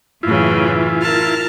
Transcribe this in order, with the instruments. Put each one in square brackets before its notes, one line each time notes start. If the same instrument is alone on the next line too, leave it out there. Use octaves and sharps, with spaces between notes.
[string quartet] F#2 A2 C#3 [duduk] E3 [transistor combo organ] E4 F4
[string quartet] A#4 A5 F6